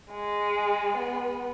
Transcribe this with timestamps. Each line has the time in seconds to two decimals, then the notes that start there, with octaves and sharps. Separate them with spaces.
0.11 G#3
0.97 B3